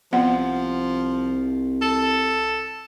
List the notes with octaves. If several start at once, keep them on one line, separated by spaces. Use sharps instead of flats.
C2 F3 B3 F#5
A4